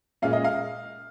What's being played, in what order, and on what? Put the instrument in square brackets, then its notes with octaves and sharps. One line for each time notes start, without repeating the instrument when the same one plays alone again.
[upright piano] A#2 G#3 C#4 F5
D#5
F5